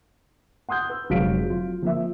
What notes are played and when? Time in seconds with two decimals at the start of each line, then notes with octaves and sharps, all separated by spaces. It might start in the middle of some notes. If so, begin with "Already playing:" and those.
0.69 F#5 C6 D#6 F#6 G6
0.90 B4 E6
1.10 F1 F#3 G#3 F5 B6 D7
1.46 F#3 F4
1.82 F3 A#3 E5